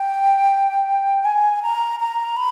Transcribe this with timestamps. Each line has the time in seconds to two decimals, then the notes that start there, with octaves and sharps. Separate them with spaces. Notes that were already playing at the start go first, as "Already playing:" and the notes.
Already playing: G5
1.24 G#5
1.62 A#5
1.99 A#5
2.36 B5